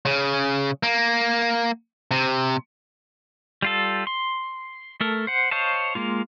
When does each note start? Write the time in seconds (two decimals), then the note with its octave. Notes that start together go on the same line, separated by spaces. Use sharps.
0.05 C#3
0.83 A#3
2.11 C3
3.62 G3 F4 A4
4.07 C6
5.01 A3 A4 A#4
5.27 C5 F#5
5.51 C5 C#5 D#5 F5 A5
5.95 G#3 A#3 F4